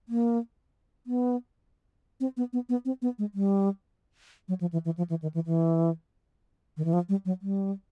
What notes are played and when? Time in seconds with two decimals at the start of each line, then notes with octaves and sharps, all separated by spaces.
0.09 A#3
1.07 B3
2.20 C4
2.37 B3
2.53 B3
2.69 B3
2.85 C4
3.02 B3
3.19 G#3
3.35 G3
4.48 F#3
4.61 F3
4.73 E3
4.85 E3
4.97 F3
5.10 E3
5.22 D#3
5.34 E3
5.46 E3
6.77 D#3
6.85 E3
6.93 F3
7.09 G3
7.25 F#3
7.42 G3